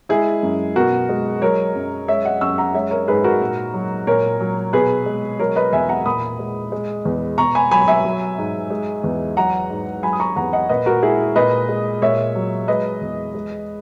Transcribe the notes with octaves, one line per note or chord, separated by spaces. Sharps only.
G#3 E4 G#4
F#2
B2 F#4 A#4
G#3
F#3 A#4 C#5
F#2
G#3 C#5 E5
D#5 F#5
F#2 C#6 E6
F#5 A#5
G#3 C#5 E5
A#4 C#5
G#2 G#4 B4
F#4 A#4
A#2
F#3
A#2 A#4 C#5
F#3
B2 G#4 B4
G#3
F#3 A#4 C#5
B4 D#5
E2 E5 G#5
F#5 A#5
A#2 B5 D#6
G#3
G#3
E2
B2 A#5 C#6
G#5 B5
F#3 G#5 B5
E5 G#5
F#3
G#2
G#3
E2
F#3 F#5 A#5
G#2
F#3 G#5 B5
D#6
A#5 C#6
E2 F#5 A#5
D#5 F#5
A#2 B4 D#5
F#4 A#4
G#3 E4 G#4
A#2 B4 D#5
G#3
A#2 C#5 E5
F#3
G#3 B4 D#5
E2
G#3